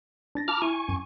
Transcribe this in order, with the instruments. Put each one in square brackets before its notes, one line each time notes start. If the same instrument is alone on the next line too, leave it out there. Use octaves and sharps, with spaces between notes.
[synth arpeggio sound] D4 A6 A#6
[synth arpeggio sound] F4 A5 [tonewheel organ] A#5 D6 F6
[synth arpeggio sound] E4 [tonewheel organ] G#5 C#6
[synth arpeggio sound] F#2 D#7